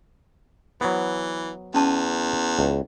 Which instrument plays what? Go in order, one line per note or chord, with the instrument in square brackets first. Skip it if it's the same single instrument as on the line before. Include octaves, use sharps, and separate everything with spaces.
[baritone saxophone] E3 [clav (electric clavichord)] F#3 B3 [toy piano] C5
[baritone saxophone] E2 [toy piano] C#4 A5 C6
[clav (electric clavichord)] C#2